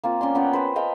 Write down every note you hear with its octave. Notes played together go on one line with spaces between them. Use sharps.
A#3 C4 F4
C#4 D5 C6
B3 C#4 F#5 G5
B4 C5 G5
D#5 F5 G5 A5